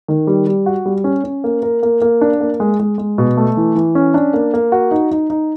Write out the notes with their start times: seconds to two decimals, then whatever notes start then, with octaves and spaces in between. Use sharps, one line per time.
0.08 D#3
0.27 G3
0.47 G3
0.66 F#4
0.86 G3
1.04 C#4
1.24 C#4
1.44 A#3
1.63 A#4
1.83 A#3
2.02 A#3
2.21 D4
2.40 A#3
2.60 G#3
2.80 G#3
2.98 G#3
3.18 B2
3.37 A3
3.57 E3
3.75 E3
3.95 C#4
4.14 D4
4.34 A#3
4.54 A#3
4.72 F#4
4.91 D#4
5.11 D#4
5.30 D#4